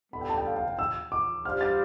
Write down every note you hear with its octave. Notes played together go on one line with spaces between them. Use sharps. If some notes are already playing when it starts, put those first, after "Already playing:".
G3 B3 D4 A4 B5
G5
A5
G5
F5
F5
G5
E6
D6
G3 D4 G4 C5 F5 F6
A6